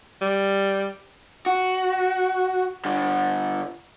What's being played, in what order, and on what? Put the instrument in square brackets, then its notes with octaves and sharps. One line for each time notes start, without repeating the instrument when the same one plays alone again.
[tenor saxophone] G3
[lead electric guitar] F#4
D3 G3